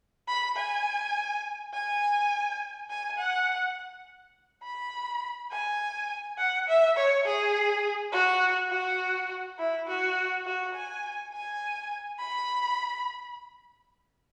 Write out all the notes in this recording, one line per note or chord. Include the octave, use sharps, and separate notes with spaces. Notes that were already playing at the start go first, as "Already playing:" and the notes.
B5
G#5
G#5
G#5
F#5
B5
G#5
F#5
E5
C#5
G#4
F#4
F#4
E4
F#4
F#4
G#5
G#5
B5